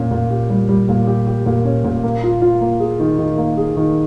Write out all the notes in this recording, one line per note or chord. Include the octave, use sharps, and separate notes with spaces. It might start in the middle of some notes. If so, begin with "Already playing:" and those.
Already playing: A#2 C#4
A#2
G4
G3
G3
A#2
G4
G4
A#2
C#4
A#2
A#3
F4
F4
A#3
G#4
D#3
D#3
A#3
G#4
D#3